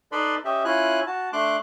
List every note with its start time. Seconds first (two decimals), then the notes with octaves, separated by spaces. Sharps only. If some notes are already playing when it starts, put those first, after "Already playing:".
0.12 D#4 A4 B4 D5 B5 C6
0.45 C#4 G4 D#5 E5
0.65 C#4 E4 F4 G#5 F#6
1.06 F#4 A5
1.33 A3 D4 C6 D6 F#6